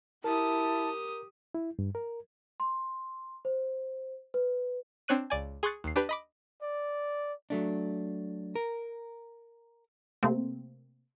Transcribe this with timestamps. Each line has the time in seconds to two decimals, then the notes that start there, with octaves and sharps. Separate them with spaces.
0.24 E4 G4 A#4 A5 D#6
1.55 E4
1.79 G2
1.95 A#4
2.60 C6
3.45 C5
4.34 B4
5.08 C4 D4 C#5 F#6 D#7
5.30 C#2 D5 G#5
5.63 G#4 C6 C#6 F#6 A6 C#7
5.84 D#2 C7
5.96 D4 G4 B4
6.09 D#5 B5 D6
6.62 D5
7.50 F#3 A3 D4
8.56 A#4
10.23 C3 A3 A#3 C4